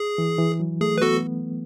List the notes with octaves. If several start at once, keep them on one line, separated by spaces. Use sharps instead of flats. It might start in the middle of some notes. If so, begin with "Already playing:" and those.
Already playing: G#4
E3
E3
F#3
A3 G#4
B4
B3 F#4 A4